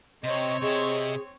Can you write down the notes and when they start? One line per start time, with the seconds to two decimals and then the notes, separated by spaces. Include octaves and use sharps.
0.24 C3 C4 C#5 D#5
0.62 C3 G#4 D#5 E5